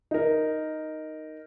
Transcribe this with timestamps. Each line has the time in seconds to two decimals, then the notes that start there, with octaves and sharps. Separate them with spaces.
0.11 D#4 A#4